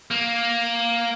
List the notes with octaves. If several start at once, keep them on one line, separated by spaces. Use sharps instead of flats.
A#3